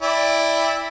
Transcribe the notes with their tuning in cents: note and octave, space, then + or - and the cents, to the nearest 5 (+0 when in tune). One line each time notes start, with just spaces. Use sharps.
E4 +0 D5 +0 G5 +35